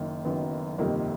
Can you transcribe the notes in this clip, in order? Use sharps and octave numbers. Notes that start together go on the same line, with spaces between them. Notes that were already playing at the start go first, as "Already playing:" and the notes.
Already playing: F#1 F#2 D#3 A#3
F#1 F#2 D#3 B3
G1 F2 C3 D#3 A#3